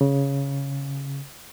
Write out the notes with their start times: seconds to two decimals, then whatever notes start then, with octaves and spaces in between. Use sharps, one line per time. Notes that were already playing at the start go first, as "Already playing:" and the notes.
0.01 C#3